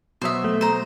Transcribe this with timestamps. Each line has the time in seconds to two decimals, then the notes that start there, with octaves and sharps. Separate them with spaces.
0.22 B2 F#3 C5 E5 D#6
0.44 A3
0.61 C5 A#5